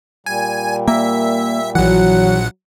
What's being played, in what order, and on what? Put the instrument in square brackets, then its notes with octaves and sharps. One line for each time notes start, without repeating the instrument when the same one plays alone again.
[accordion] A#2 G3 [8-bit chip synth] G#5
[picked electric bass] A#3 [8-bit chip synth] E5
[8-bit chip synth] A#1 F#5 [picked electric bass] E3 [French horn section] F#3